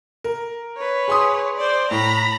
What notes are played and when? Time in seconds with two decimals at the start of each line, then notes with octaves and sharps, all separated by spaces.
0.24 A#4
0.77 B4 C#5
1.08 G#4 C6 D#6
1.57 C5 D5
1.91 A2 A#5 B5